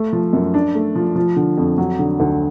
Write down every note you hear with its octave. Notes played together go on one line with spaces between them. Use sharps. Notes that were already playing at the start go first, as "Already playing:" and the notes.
Already playing: A3
F3
F#2
D4
A3
F3
F3
D3
F2
F#3
D3
D2